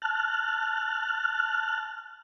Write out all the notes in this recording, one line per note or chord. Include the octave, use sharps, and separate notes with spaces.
A5 F6 F#6